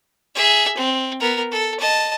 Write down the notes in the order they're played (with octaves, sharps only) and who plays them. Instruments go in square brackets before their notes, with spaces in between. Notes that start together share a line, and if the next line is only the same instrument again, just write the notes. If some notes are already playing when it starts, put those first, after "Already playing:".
[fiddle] G#4 E5
C4
B3 A#4
A4
D#5 A5